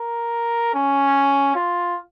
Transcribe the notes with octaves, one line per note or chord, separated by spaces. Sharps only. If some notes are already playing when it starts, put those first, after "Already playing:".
Already playing: A#4
C#4
F4